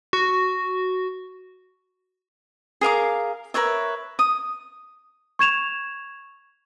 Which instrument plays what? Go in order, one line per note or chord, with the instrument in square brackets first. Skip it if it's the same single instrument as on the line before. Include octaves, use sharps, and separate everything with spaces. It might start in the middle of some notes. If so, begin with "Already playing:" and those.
[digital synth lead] F#4
[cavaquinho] G#4 A#4 F5 D6
A#4 B4 C#5 E5
D#6
[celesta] C#6 G#6 E7 F7